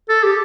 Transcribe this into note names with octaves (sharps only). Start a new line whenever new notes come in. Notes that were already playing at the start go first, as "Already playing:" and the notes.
A4
G4